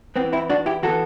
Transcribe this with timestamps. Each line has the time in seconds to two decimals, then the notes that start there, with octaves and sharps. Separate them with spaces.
0.16 B3 C4
0.20 E3
0.32 C4 E4
0.50 D4 F#4
0.66 E4 G4
0.83 E3 B3 F#4 A4